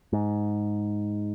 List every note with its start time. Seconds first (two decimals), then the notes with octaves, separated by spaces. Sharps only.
0.13 G#2